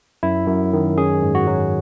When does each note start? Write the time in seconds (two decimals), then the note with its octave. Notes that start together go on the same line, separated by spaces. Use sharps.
0.23 F#2 E4
0.47 F#2
0.73 D#3
0.98 C#4 G#4
1.22 G#2
1.35 F#4
1.47 F#3